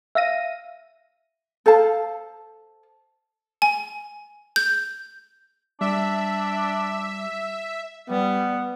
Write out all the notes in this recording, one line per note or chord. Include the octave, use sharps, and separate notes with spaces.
E5 F5 A#6 D#7
A4 C5 F5 A5
G#5
G6
G3 D4 E5
G3 B3